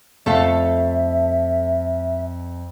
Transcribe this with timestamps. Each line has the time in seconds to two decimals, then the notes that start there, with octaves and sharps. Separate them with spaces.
0.26 F2 A3 A4 E5 F5 A5